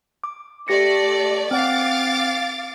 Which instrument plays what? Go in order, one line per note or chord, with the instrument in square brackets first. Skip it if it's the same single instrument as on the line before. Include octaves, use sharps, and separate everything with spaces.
[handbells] D6
[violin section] A3 D5 [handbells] G4 A#6 C#7
[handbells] C4 F#5 [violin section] F5 D6 A6